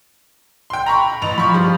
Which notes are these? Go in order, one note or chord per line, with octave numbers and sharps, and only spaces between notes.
G5 C6
A#5 B5 C#6
A1 F7
F3 B5 C#6
G3